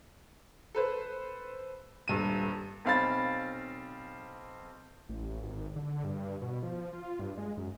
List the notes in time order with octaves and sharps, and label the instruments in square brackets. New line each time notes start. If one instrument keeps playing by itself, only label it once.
[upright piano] A4 B4 C5
D#1 G2 D#7
B1 C4 F5 B5 A6
[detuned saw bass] A1
G#1
D3
G2
B2
F3
F4
G2
G#3
F#2